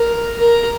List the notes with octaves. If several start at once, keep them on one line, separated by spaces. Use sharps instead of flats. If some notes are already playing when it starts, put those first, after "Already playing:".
Already playing: A#4
A#4